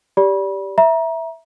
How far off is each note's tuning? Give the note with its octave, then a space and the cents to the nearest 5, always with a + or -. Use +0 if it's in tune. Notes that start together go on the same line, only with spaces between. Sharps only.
G4 +0 D5 -25 B5 -30
E5 +0 A#5 +25